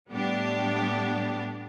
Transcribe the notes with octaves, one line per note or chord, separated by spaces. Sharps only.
A2 G3 B3 D4 G4